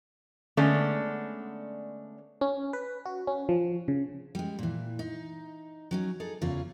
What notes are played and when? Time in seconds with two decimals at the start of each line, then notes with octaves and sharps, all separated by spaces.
0.57 D3 G#3 A3 B3 C#4 D4
2.41 C#4
2.73 B4
3.06 F#4
3.27 C#4
3.49 F3
3.88 C#3
4.35 G3 G#3
4.59 A#2 E3
4.99 D#4
5.91 F#3 C#4 D#4
6.20 D#4 G#4 A4
6.41 E2 C#3 F4 G#4